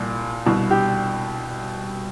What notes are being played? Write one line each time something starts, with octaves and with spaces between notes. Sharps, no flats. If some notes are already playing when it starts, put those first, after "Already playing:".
Already playing: C2 A#2
C2 B2
G4